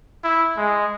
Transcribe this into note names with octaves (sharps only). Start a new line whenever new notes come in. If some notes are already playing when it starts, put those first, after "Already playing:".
E4
G#3